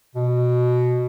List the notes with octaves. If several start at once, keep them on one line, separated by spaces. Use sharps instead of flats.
B2